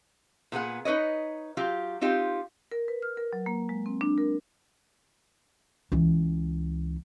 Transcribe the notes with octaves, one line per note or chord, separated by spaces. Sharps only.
A#2 B3 G#4 F#5
D#4 B4 C#5 D#5
F#3 F4 G4
C4 D#4 F4 G4
A#4
B4
F6
A#4
F#3
A#3
G#3
C4
D4
A#4
C#2 E3